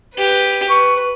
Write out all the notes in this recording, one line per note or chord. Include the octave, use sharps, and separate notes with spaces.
G4 B4
B4 C#6